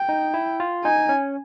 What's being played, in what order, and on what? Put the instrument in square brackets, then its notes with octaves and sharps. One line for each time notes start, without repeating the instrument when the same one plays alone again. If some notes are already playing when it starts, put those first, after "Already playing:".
Already playing: [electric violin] G5
[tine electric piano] D#4
E4
F4
[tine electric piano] D#4 [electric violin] G#5
[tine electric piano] C#4